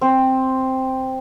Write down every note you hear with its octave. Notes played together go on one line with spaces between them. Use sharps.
C4